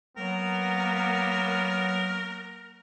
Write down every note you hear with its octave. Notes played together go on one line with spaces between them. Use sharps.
F#3 A#3 B3 A#4